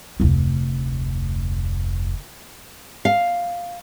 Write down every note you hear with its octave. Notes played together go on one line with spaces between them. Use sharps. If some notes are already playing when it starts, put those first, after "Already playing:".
F1 D2
F5